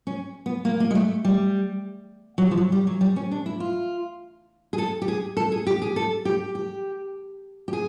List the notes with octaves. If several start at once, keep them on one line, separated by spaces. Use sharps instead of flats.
C#4
B3
A#3
A#3
G#3
A3
G3
F#3
G3
F3
F#3
G3
F#3
G3
C#4
D4
E4
F4
G#4
A4
G4
G#4
A4
G#4
G4
G#4
A4
G4
G4
G4
G#4